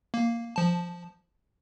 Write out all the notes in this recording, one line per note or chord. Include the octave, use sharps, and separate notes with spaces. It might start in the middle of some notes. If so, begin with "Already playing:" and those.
A#3
F3 A5